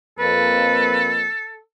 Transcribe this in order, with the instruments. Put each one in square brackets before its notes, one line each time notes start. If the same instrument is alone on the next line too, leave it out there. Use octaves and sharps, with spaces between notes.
[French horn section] F2 A#3 [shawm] A4 [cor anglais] B4